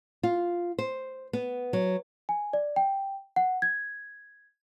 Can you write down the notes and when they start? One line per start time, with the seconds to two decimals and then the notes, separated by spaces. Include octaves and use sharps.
0.23 F4
0.79 C5
1.33 B3
1.73 F#3
2.29 G#5
2.53 D5
2.76 G5
3.36 F#5
3.62 G#6